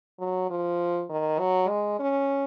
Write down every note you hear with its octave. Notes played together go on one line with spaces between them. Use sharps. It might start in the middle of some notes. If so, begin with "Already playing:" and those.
F#3
F3
D#3
F#3
G#3
C#4